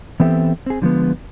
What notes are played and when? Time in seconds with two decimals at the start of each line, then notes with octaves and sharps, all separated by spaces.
0.20 E3 B3 C4 G4 A4 E5
0.66 C4 G#4
0.82 D3 F3 G#3 B3